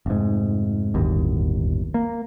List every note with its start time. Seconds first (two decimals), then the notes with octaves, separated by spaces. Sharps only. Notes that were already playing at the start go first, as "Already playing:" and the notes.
0.06 F1 G#2
0.94 D1 G1 D#2
1.94 A#3